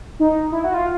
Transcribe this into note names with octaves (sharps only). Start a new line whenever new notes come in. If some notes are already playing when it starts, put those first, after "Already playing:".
D#4
E4
F#4
F4